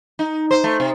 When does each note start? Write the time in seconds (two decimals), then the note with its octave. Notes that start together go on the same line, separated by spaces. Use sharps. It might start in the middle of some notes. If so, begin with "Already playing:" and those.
0.19 D#4
0.51 C5
0.64 A3
0.80 C3